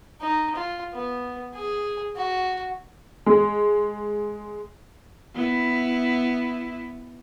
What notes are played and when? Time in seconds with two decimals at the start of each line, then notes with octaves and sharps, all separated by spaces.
0.21 D#4
0.55 F4
0.94 B3
1.54 G#4
2.17 F#4
3.26 G#3
5.35 B3 E4